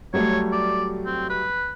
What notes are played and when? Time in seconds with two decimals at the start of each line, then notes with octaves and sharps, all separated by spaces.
0.14 F#3 G3 A3 C#5
0.52 D5
1.06 C4
1.30 B4